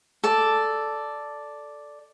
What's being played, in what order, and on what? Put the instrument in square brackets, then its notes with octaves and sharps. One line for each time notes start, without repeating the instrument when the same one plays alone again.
[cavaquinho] A4 D5